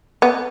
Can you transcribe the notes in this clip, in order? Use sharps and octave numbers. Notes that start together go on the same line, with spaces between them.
B3